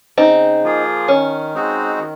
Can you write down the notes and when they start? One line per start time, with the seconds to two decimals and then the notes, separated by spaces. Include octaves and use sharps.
0.18 C#3 C4 D#4
0.63 F3 A#3 F4 G#4
1.08 D#3 C#4
1.54 G#3 C4 D#4 F#4
1.99 D#3